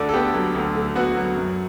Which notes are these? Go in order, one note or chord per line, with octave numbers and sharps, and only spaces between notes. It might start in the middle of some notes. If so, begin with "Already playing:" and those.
Already playing: D2 D3 D5
A4
B3 G4
F#3
D2
D3
B3 F#4
F#3
F#2